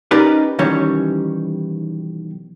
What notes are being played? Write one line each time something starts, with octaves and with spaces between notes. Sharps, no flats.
C#4 D#4 G4 A#4 B4 D5
B1 D#3 E3 G3 C#4 C#5